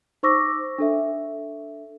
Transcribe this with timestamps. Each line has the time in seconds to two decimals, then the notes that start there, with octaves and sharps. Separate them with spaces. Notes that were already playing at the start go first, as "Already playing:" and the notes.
0.23 D#4 C5 C#6 D6 E6 A#6
0.78 D4 A4 E5